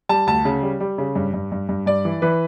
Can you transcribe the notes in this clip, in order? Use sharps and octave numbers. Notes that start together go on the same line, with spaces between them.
G3 A5
D2 A5
C#3
G3
G3
C#3
G2
G2
G2
G2
G2 D5
E3
E3 B4